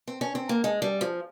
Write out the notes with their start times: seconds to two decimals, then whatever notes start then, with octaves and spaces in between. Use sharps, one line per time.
0.07 C4
0.21 C#4
0.35 C4
0.49 A#3
0.64 G#3
0.82 G3
1.01 F3